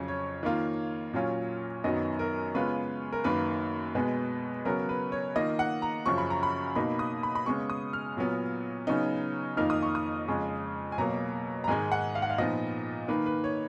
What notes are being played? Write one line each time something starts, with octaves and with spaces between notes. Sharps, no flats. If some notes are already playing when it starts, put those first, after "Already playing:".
Already playing: F2 C#3 F#3 C#4
C#5
D#3 A#3 F4
A#2 F#3 C#4 F4
F#2 D#3 F#3 B3 D#5
A#4
C#3 G#3 B3 F4 B4
A#4
F#2 D#3 A#3 B4
B2 G#3 B3
C#3 F#3 B3 A#4
B4
C#5
D#3 A#3 F4 D#5
F#5
A#5
F#2 C#3 F3 C#6
B5
A#5
B5
B2 A#3 D#4 B5
D#6
B5
B5
C#3 G#3 B3 C#6
D#6
F6
A#2 F#3 B3
C#3 F#3 B3 D#4
F2 D#3 A#3 D#4 F6
D#6
C#6
D#6
F2 C#3 G#3 C#4
G#5
B2 F#3 A#3 A#5
A#5
G#2 D#3 G#3 D#4 G#5
F#5
F5
F#5
F5
A#2 F3 B3 D#4 D#5
D#3 A#3 D#4 B4
B4
C#5